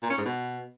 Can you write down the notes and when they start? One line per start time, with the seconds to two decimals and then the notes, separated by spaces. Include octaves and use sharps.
0.02 A#2
0.10 C#4
0.18 G#2
0.25 B2